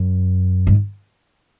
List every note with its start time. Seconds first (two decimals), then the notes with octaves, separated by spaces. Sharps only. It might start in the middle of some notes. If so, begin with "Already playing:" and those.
Already playing: F#2
0.67 G#2